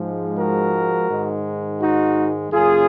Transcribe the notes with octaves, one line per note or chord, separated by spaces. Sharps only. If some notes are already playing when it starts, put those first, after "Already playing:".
Already playing: G#2 F3 G#3
F#4 A#4
G#2 D#3 G#3
D#4 F#4
F#2 C#3 F#3 A#3 F4 G#4